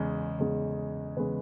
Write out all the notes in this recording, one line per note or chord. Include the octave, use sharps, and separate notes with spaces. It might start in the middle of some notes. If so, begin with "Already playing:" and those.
Already playing: E2 C#3 G#3
E2 C#3 G#3
E2 C#3 G#3 B4